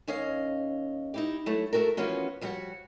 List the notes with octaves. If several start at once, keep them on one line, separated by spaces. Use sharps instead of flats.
D#2 C#4 D#5 F5
D#4 E4 G4
F#3 A3 E4
A3 C#4 F#4 A4 A#4
E3 F3 A#3 B3 C#4 F#4
F3 G3 F#4 C#5 F#5